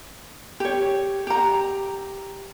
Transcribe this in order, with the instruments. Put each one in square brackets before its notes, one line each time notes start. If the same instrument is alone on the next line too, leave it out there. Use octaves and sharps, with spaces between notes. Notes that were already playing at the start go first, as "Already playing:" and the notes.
[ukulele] G4 C#5
G4 A#5